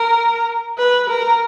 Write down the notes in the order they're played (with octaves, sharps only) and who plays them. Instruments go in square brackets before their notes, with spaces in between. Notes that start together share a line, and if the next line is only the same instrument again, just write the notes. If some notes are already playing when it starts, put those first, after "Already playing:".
Already playing: [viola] A#4
B4
A#4